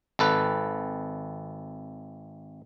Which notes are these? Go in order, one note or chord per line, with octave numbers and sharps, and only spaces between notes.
G#1 A4 B4